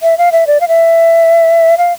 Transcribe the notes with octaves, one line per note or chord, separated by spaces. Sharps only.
E5
F5
E5
D5
F5
E5
F5